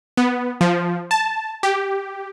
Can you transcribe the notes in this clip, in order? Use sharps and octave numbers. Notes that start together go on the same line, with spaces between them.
B3
F3
A5
G4